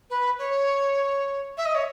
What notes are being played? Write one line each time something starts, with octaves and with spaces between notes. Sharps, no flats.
B4
C#5
E5
D#5
C#5